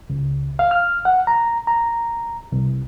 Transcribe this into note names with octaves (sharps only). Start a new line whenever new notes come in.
C#2
F5
F6
F#5
A#5
A#5
C2